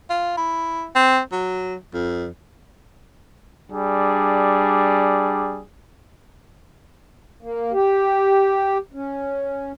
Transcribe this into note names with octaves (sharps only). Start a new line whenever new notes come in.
F4
E4
C4
F#3
F2
G3 D4 G#4
A#3
G4
C#4